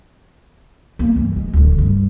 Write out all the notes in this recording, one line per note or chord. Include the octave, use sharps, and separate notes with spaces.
A#3
G2 E3
G#3
D1 D3
G2